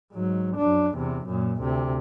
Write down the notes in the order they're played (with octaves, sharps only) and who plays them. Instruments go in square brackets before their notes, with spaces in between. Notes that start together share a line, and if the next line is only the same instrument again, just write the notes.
[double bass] G#2 F#3
F#2 D4
E2 C3
F#2 A#2
D2 C3